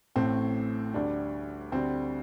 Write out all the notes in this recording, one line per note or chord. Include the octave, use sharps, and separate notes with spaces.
A1 A2 A3 C4
D2 D3 G3 D4
D2 D3 G3 C4